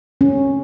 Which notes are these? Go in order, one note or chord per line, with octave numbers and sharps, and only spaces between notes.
C#4